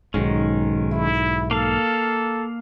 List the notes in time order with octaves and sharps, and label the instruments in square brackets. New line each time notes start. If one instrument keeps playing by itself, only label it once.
[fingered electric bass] B1 G#2 [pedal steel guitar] D#3 G#3 C#4
[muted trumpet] E4
[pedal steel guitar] A#3 F5 [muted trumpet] A4